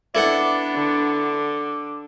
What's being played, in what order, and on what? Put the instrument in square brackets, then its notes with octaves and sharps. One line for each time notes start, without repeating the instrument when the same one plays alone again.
[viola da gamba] B3 D4 [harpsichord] E4 A4 F#5 [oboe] D5
[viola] D3 [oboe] D6